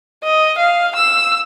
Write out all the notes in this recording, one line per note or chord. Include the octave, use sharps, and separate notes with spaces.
D#5
F5
E6